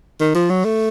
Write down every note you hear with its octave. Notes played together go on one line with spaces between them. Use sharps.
D#3
F3
F#3
A3